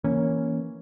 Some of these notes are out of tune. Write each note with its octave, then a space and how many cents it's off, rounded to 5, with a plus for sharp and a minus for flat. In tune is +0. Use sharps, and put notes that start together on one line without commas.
E3 +0 A#3 +5 C#4 +0